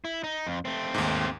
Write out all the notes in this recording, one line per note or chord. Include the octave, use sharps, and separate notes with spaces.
E4
D#4
F2
A3 C4
D#2 G#2